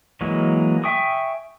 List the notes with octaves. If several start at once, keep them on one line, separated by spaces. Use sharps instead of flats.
E3 F#3 G#3 A#3
E5 G5 G#5 C#6 D#6